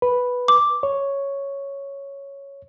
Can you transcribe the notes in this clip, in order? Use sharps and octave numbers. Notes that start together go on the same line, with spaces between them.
B4
D6
C#5